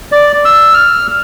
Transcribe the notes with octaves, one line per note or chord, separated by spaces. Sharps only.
D5
E6
F6